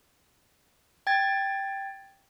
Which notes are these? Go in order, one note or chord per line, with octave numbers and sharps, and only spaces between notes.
G5 G#6 A6